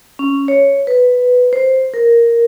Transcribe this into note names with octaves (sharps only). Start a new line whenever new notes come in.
C#4
C#5
B4
C5
A#4